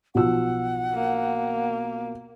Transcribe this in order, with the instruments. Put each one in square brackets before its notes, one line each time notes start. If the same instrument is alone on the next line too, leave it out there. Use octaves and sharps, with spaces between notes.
[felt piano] B1 F3 E6 [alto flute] F#5
[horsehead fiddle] A#3